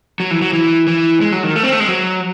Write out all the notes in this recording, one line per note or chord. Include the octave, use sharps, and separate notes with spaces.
F#3
E3
F#3
E3
E3
G#3
F#3
D#3
A3
C4
A3
G#3
F#3